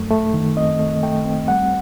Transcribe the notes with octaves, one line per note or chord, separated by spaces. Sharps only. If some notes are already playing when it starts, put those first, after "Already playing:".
Already playing: F#2 A3
A3
D#3
C4 D#5
A3
A3 G5
C4
G3 F#5